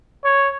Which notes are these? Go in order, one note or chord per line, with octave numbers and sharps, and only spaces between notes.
C#5